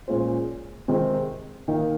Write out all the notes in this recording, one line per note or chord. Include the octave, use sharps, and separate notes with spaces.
A#2 G#3 C#4 F4 C5
C3 D#3 G#3 C4 D#4
D#3 A#3 D#4 A#4 F5